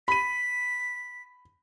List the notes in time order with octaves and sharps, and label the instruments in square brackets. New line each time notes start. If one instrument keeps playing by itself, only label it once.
[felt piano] B5 D#7 [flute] B6